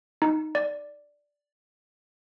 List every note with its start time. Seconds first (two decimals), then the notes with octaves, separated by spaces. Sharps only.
0.22 D#4
0.55 D5